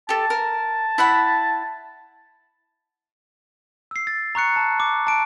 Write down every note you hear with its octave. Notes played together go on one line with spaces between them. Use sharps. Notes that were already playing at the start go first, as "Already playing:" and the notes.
G4 A4 A5
A#4
E4 F#5 B5
E6 C7
A6
A#5 C#6 F#6 C#7
A5
D6
A5 D7